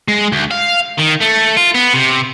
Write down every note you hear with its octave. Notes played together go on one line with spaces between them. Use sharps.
G#3
D2
F5
D#3
A3
F4
B3
C3